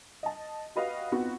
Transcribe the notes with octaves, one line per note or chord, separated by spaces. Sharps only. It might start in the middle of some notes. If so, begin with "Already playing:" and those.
D#5 A5
F#4 G4 B4 D#5 F5
B3 C4 D#4 F4 F#4 B4